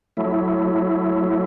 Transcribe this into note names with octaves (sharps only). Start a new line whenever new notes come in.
F#3 A3 E4